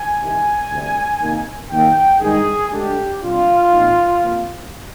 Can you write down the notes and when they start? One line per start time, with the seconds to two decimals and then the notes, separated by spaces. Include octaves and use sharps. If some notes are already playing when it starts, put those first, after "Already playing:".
Already playing: G#5
0.20 C2 C3 D#3
0.70 D2 C3 G3
1.20 C3 D#3 A#3 D#4
1.70 D#2 D#3 A#3 G5
2.20 G2 D#3 G#3 D#4 G#4
2.70 D2 D3 G#3 D4 G4
3.20 C3 G3 D4 F4
3.72 A#2 F3 C4 D#4
4.21 C3 F3 A#3